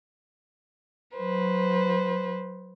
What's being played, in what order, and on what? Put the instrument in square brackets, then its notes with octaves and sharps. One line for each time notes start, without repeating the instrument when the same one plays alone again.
[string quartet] F#3 B4 C5